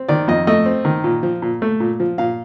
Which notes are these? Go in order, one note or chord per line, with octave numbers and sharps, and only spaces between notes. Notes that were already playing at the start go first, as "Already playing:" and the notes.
Already playing: C4
D#3 D5
F2 D#5
A3 D#5
C4
D#3
A#2
F3
A#2
A3
A#2
F3
A#2 F5